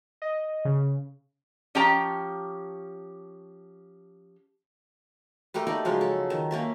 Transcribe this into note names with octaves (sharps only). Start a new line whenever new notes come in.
D#5
C#3
F3 C#4 G4 G5 A5 A#5
G3 A3 G4 A#4
D#4 G4 D5 F5
C#3 F3 F#3 G#3
A4
D#3
A#3 C#4 E5